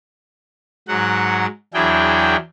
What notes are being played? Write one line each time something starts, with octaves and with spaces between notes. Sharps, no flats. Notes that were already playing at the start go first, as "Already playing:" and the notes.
G#2 F#3 F#5
E2 F#3 D4 E4 G#4 G5